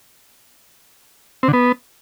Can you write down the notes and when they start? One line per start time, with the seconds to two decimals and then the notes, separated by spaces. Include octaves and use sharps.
1.43 C4
1.48 D3
1.53 B3